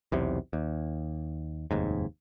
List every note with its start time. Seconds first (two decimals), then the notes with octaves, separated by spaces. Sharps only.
0.12 B1 E2 C3
0.53 D#2
1.71 F1 D#2 G#2